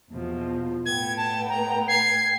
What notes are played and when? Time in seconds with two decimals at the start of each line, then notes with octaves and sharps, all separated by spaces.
0.10 E2 B2 F3
0.86 A2 B3 G5 G#6
1.17 A5
1.49 A#5
1.88 G#6 C7